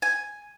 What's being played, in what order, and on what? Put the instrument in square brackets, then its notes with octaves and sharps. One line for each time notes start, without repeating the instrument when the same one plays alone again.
[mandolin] G#5